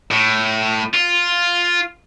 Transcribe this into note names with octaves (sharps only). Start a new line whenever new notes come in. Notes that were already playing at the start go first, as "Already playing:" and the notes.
A2
F4